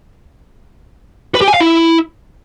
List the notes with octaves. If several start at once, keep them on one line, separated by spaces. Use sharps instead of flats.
B4
G4
G#5
F5
E4